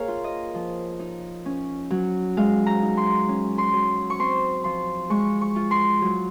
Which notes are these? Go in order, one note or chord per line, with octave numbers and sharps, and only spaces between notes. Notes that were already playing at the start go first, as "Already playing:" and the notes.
Already playing: A#3 G#4 A#4 C#5 F5
F4
D#5
F3
D#4
C#4
F#3
G#3 F5
A#5
D#4
C6
C#4
C6
F#3
C#6
C4 C6
F3 C6
G#3 C#6
C#6
F4
C6
F#3